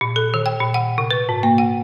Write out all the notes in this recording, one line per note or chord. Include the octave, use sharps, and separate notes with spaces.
A#2
A4
D#3
G5
A#2
F#5
C3
B4
G#2
A#3
F#5